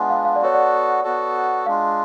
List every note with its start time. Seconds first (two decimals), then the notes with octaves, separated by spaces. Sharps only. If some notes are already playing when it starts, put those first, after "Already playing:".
Already playing: G#3 B3 D4 F4 D5 F5 F#5 G#5
0.10 F5
0.25 F5
0.36 D5
0.41 B3 F#4 A4 C#5
0.54 D5
1.04 B3 F#4 A4
1.66 G#3 D4 F4 F5